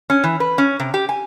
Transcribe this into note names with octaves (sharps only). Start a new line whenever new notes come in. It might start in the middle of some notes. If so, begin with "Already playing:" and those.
C#4
E3
B4
C#4
C3
G4
G#5